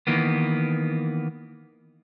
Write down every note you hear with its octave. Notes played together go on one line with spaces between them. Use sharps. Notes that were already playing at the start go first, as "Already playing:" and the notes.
D#3 E3 A#3 B3